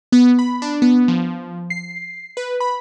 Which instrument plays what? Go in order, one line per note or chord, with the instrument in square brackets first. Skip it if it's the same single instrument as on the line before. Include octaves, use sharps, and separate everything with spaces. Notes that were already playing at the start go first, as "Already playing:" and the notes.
[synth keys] B3
B5
D4
B3
F3
C7
B4
B5